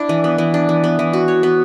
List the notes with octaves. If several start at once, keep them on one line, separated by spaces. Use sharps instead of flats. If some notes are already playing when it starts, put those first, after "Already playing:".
Already playing: D4 E4
E3
B3
E3
D4
E3
B3
E3
F#4
C#5
B3